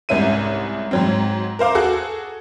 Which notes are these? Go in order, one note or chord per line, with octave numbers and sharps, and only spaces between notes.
C2 G#2 C#4 E5 D#7
G#2 F#3 C4
A#4 C5 F5 D6
F#4 G#4 A4 F#5